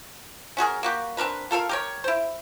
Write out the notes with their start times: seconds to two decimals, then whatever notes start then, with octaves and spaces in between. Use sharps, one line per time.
0.57 C#4 F#4 G#4 A#4
0.83 A#3 F#4 G4
1.17 C4 D4 A#4 B4
1.51 F4 A4 A#4 F5
1.69 G4 A#4 C#5
2.04 E4 C5